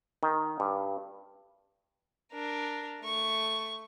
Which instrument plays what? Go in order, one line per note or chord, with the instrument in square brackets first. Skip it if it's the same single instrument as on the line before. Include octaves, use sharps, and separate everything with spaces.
[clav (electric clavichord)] D#3
G2
[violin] D4 A#4
A3 C#6